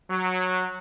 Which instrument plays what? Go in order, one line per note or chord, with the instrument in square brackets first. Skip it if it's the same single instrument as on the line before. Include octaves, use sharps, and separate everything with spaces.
[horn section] F#3